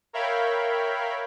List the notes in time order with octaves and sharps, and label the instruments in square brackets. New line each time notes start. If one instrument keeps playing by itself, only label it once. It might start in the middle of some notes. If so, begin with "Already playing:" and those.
[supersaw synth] A#4 C#5 E5 F5 G5 B5